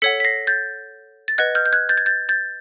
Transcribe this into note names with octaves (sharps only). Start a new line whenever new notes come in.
A4 C#5 F#5 B6 C#7
B6
A#6 C7
G6 A6
A6
B4 D#5 F#5 F#6 G#6
F6 G6
G6
F#6 G#6
G6 A6
G#6
G6 A6
G6 A6